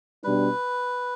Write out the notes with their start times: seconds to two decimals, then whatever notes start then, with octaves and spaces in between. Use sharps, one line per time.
0.23 B2 G3 D4 B4